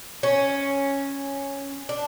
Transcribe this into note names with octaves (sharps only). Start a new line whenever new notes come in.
C#4
D4